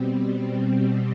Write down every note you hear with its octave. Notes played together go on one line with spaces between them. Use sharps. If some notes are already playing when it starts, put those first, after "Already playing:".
Already playing: B2 G3 C4